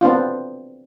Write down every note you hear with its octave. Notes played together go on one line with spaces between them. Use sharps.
B3 C4 D4 F4